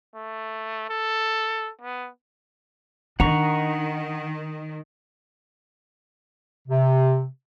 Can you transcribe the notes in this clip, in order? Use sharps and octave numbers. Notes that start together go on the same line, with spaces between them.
A3
A4
B3
D#3 D4 F#5 A#5 C#6
C3